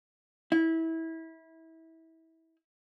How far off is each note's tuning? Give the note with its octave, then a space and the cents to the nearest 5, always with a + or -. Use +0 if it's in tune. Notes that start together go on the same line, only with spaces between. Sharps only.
E4 -25